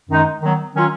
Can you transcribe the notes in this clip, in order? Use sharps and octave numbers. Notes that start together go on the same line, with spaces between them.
F#2 D#3 G#3 D#4
D#3 F#3 B3
D#3 F#3 C#4 F4